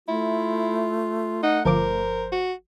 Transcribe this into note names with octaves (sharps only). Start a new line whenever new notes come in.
A3 E4 F4
D#4 F#5
G1 F3 A#4 C5 D6
F#4